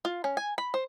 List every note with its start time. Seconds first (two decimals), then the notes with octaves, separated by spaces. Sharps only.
0.05 F4
0.24 C#4
0.37 G#5
0.58 B5
0.74 C5